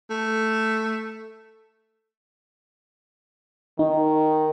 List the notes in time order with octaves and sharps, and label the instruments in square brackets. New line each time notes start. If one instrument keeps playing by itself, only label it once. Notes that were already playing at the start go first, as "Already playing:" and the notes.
[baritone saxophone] A3
[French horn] D#3 [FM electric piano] D#4